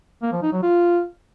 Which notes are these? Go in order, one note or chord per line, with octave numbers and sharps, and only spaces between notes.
A#3
F3
D#4
F#3
F4